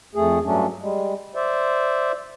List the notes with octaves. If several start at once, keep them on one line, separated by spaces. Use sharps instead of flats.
F2 A3 G#4
G2 F#3 A3 C#4 D4
G3 G#3
C5 D5 E5